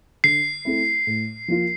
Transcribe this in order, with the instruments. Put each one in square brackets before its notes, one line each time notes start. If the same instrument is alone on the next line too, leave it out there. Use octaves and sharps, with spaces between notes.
[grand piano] D3 [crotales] C7
[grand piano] A3 C4 E4
A2
F3 A#3 F4